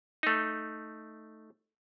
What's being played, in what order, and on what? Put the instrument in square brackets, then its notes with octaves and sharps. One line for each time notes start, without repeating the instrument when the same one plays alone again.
[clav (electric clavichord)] A3 D#4